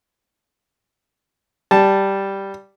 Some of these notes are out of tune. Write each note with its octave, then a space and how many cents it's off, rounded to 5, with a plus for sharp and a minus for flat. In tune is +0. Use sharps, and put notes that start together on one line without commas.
G3 +0 A5 +0